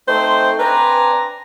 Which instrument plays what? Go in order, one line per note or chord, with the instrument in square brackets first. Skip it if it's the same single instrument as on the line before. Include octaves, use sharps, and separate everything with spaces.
[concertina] A3 C4 D#4 [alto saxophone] C5
[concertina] C4 D4 G#5 [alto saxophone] B4 [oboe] A#5